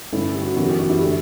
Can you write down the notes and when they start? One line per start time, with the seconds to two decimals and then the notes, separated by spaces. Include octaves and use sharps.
0.13 G2 D3 A3 C#4 E4
0.35 G4
0.42 F#4
0.56 F#2 E3 B3 F#4
0.68 G4
0.79 F#4
0.89 E4
1.01 D3 A3 G4